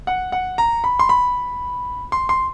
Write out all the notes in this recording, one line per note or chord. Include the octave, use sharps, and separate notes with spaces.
F#5
F#5
A#5
B5
C6
B5
C6
C6